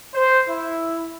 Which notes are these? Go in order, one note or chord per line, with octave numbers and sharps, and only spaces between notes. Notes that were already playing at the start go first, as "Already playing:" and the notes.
C5
E4